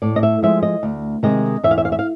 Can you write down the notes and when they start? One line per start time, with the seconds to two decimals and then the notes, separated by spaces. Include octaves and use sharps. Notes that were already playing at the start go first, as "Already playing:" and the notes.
0.02 A2 D5
0.16 D#5
0.23 E5
0.42 F3 G#3 E5
0.63 D#5
0.83 D2
1.23 C3 D#3 G#3 D#5
1.64 E2 E5
1.71 F5
1.78 E5
1.85 F5
1.92 E5
1.99 F5